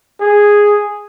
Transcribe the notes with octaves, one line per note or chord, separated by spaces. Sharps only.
G#4